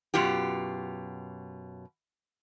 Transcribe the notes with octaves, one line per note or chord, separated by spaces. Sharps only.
F#2 B2 F4 G4